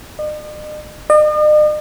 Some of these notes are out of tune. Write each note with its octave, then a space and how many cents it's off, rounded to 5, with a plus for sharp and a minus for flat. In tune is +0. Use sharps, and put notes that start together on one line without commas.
D#5 -45
D#5 -45